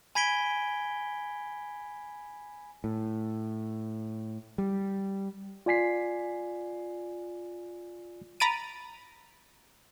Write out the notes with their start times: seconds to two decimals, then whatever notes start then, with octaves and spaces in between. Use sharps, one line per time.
0.15 G#5 B5 G#6 B6 D7 G7
2.84 A2
4.58 G3
5.66 F4 D5 G#5 B6 C7
8.40 A#5 B5 A6 D7 D#7